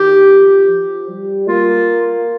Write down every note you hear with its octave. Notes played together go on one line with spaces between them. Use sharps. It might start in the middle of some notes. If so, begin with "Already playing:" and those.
Already playing: D#3 G4
F3
F3
G3
A#3 F4